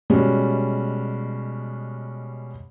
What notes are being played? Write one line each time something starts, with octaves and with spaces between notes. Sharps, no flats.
B2 G3 G#3 C#4